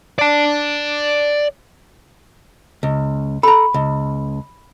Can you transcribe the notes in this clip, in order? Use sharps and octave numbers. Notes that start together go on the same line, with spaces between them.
D5 A5
C#2
A4 A#5 B5
C#2